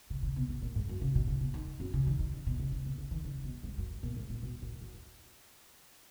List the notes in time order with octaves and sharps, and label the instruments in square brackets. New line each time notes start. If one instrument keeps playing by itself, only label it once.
[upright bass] C#3
C#3
B2
B2
A#2
G#2
F#2
C#3
B2
C#3
B2
D#3
F#2
C#3
D#3
D#3
C#3
B2
C#3
C#3
A#2
C#3
D#3
C#3
B2
G#2
F#2
G#2
A#2
G#2
A#2
B2
A#2
F#2